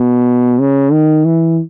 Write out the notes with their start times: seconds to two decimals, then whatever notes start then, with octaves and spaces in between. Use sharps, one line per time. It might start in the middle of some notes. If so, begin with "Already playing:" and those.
Already playing: B2
0.59 C#3
0.92 D#3
1.25 E3